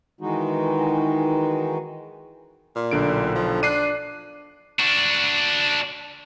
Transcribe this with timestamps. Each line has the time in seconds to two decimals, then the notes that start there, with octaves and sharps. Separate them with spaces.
0.21 D#3 E3 G#3 D#4 F#4
2.76 A#2
2.91 B1 D3 D7
3.35 F3
3.63 D4 F#6 C7 D#7
4.79 D4 F#4